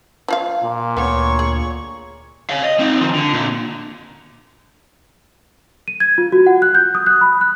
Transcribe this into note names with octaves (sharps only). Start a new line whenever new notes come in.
F3 F4 F5
A#2
D2 B3 C#5
G#4
C#5 F5
D#5
C4 D#4
D#3 F3
D3
A#2 D3
D#7
G#6
F4
F#4
F#5
F#6
G6
D#6
F#6
B5
F#6